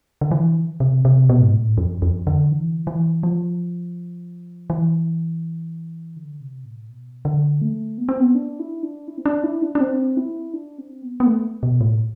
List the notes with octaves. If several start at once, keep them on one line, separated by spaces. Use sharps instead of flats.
D3
E3
C3
C3
B2
G#2
A2
F2
F2
D3
E3
E3
F3
E3
D3
C3
A2
B2
D3
A3
B3
C4
B3
D4
E4
D4
E4
C4
D4
E4
D4
D4
C4
E4
D4
C4
B3
B3
A3
B2
A2